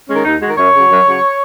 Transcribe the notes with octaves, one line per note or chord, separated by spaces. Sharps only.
D#3 G#3 C#4
D#2 D#4
D#3 G#3 F#4
F#2 C#5
C#3 F#3
F#2
C#3 F#3